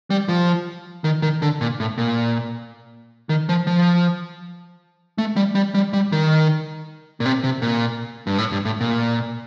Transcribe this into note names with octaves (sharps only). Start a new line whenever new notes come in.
G3
F3
D#3
D#3
D3
A#2
A2
A#2
D#3
F3
F3
A3
G3
G3
G3
G3
D#3
A#2
C3
C3
A#2
G2
A2
G2
A2
A#2